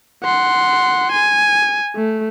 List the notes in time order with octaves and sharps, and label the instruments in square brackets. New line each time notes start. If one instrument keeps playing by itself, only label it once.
[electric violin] F#5 C6
G#5
A3